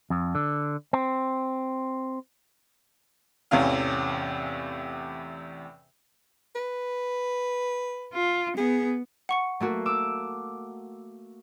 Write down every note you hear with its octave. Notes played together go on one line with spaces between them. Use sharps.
F2
D3
C4
E2 A2 C3 E3 C#4 F5
B4
F4
B3 G#4
F#5 C#6 C#7
A3 A#3 F#4
D6 E6